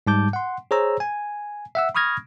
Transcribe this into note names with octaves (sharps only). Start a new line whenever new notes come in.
G#2 G3 A5 D6 G6
F#5 C6
G#4 C5 C#5 A#5 E6
G#5
E5 F#5 E6
B5 C#6 D#6 F6 G#6 A#6